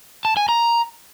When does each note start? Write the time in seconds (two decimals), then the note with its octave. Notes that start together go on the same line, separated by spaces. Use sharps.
0.25 A5
0.37 G#5
0.49 A#5